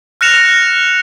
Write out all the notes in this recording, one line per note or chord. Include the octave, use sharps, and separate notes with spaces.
F6 F#6 A#6 C#7 E7 F7